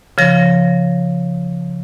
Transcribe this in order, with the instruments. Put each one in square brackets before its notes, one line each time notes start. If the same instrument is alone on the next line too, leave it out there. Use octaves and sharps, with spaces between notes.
[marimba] C#3 F3 A#6